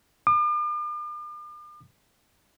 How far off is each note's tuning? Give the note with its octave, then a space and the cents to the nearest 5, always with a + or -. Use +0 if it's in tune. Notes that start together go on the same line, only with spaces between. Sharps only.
D6 +45